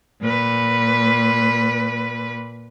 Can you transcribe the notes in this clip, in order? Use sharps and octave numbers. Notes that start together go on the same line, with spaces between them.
A#2 B4